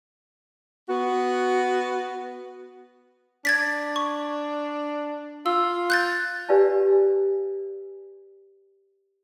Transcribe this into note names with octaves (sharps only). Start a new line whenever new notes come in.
B3 F#4
D4 G#6 A6 B6
C#6
F4 E6
F#6 G6 A6
G4 B4 D5 F5 G#5 A5